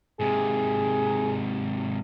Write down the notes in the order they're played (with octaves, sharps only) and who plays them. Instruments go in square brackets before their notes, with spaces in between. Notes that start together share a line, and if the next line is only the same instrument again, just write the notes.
[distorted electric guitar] G#2 C3 [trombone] G#4